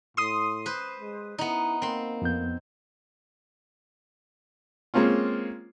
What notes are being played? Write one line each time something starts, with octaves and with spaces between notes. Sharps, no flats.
A2 C6 D#6
B4 C5
G#3
B3 D#4 E4
A#3 C4 C6
F2 B3 G6
G#3 A#3 C4 C#4 F4